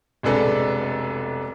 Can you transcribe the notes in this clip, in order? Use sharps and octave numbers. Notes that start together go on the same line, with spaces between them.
F1 B1 G#3 D4 A4 B4